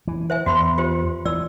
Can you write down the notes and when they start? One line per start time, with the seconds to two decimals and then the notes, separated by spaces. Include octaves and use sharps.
0.07 E3
0.30 C5 E5 G#5
0.46 E2 F#4 B5 C6
0.78 F4 G4 C5
1.25 E3 D5 E6